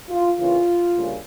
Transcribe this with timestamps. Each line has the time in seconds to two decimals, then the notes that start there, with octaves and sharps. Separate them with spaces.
0.09 F4
0.37 C#3 E3 A#3 C#4 F4
0.94 D2 C#3 G3 A#3 C#4